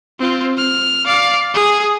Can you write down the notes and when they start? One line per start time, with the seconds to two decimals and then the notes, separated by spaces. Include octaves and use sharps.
0.20 C4 F4
0.57 F6
1.06 D5 F5
1.54 G#4